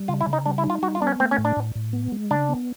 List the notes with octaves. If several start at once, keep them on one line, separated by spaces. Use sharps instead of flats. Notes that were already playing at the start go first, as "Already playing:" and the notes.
Already playing: G3
C#3 F4
E4
C#3
D#4
G3 D4
E4
D#4
F4
G3 F#4
F4
B3 D4
C#4
A3 C4
C#4
A2
D4
A2
A2
B3
G#3
C#3 D4
B3